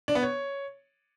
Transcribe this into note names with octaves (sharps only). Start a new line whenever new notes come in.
D4
B3
C#5